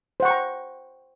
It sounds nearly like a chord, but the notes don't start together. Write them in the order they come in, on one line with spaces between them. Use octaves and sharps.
C5 F#5 C#6 G5 A#5